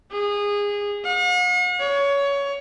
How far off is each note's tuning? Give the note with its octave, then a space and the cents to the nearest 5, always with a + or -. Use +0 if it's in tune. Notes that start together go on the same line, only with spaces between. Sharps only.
G#4 -20
F#5 -45
C#5 +20